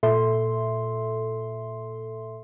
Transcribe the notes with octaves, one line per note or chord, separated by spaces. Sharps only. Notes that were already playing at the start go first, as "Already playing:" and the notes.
A#2 A4 E5 C6